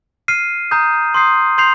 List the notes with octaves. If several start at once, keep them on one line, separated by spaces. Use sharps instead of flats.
F6 C7 D#7
A#5 D#6 G6
C6 D#6 G6 C7
C6 G6 C7 F7